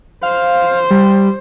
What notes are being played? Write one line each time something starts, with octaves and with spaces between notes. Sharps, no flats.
C5 F5
G3